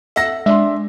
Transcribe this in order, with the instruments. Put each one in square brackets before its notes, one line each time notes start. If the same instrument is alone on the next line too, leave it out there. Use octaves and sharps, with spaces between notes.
[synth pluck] A4 F#5 E6 [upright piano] E5 A#6
[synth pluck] G#3 [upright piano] D4 C6 [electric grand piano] E5